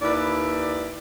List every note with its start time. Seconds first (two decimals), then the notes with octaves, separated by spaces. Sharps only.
0.02 D#2 E4 B4 D5